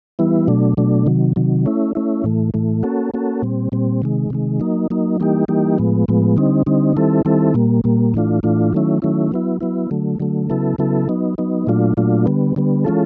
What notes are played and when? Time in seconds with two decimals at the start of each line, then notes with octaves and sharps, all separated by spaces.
0.19 E3 G3 B3 E4
0.48 B2 F#3 A3 D4
0.77 B2 F#3 A3 D4
1.06 C3 D#3 F#3
1.36 C3 D#3 F#3
1.66 A3 C#4 E4
1.95 A3 C#4 E4
2.24 A2 E3 A3
2.54 A2 E3 A3
2.83 A#3 C#4 F#4 A4
3.14 A#3 C#4 F#4 A4
3.42 A#2 G3 C4
3.72 A#2 G3 C4
4.02 C3 D#3 G#3
4.30 C3 D#3 G#3
4.60 F#3 A#3 D#4
4.90 F#3 A#3 D#4
5.20 E3 G3 A#3 D#4 G4
5.48 E3 G3 A#3 D#4 G4
5.78 A2 F3 G#3 B3
6.08 A2 F3 G#3 B3
6.37 D3 G3 C4 D#4
6.66 D3 G3 C4 D#4
6.97 D#3 G3 C4 E4 A4
7.25 D#3 G3 C4 E4 A4
7.54 A#2 G3 A#3
7.84 A#2 G3 A#3
8.14 A2 E3 A3 D4 F4
8.43 A2 E3 A3 D4 F4
8.73 D#3 F#3 A3 C#4 E4
9.02 D#3 F#3 A3 C#4 E4
9.32 F#3 B3 E4
9.61 F#3 B3 E4
9.91 D3 F#3 A3
10.20 D3 F#3 A3
10.50 C#3 F#3 B3 E4 A4
10.78 C#3 F#3 B3 E4 A4
11.09 F#3 B3 D#4
11.38 F#3 B3 D#4
11.67 A#2 F#3 A3 D4 F4
11.97 A#2 F#3 A3 D4 F4
12.26 D3 G3 B3
12.56 D3 G3 B3
12.85 E3 G#3 C#4 F4 A4